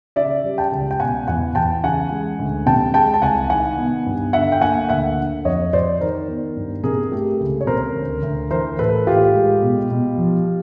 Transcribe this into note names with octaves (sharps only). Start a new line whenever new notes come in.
C#3 D5 E5
G3
G5 A5
C#2
G5
B2 F#5 G#5
E2 F#5 G#5
E2 G5 A5
C#3 F#5 G#5
G#3
D2
C3 G5 A5
G#3 G5 A5
A5
C2 F#5 G#5
D#3 F#5 G#5
B3
G2
D3 E5 F#5
G5
A#3 F#5 G#5
D2 E5 F#5
D3
F2 C#5 D#5
F2 C5 D5
D#3 A#4 C5
B3
G2
C3 G#4 A#4
A3 G4 A4
C#2
C#5
C3 A#4 C5
D2
D2
E3 A#4 C5
A2 A4 B4
A2 F4 G4
G#3
B2
B2
F3